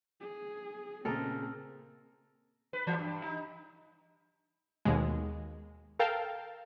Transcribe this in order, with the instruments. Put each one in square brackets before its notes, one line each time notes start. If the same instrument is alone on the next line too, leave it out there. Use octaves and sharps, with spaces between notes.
[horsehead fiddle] G#4
[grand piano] A#2 C#3 [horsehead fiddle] C4 [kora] A4 A#4 D#5
[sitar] B4
E3
G2
D#4
[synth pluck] D#2 B2 G#3
A4 A#4 F5 G5 A5